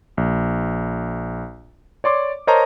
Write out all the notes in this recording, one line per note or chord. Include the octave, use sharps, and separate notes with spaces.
A#1
C#5 D5 C6 D6
A#4 C5 C#5 D#5 A5 A#5